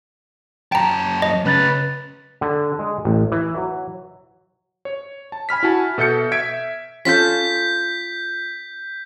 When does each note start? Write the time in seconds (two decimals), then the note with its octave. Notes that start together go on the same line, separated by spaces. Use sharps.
0.72 F#2 G5 A5 A#5
1.22 D#5
1.45 C#3 C#4 B4 F#6 A6
2.41 D3
2.79 G#3
3.05 A1
3.32 E3
3.57 F#3
4.85 C#5
5.32 A5
5.49 G#5 B5 F6 B6
5.63 E4 F#4 G#5 A5
5.98 B2 A4 E5 G6 C#7
6.32 E5 G#6 B6 D7
7.05 C#4 F4 A4 G6 B6